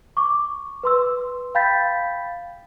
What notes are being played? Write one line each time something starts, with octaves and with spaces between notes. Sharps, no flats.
C#6 D6
B4 C6 E6
F5 G5 B5 G6 A6 B6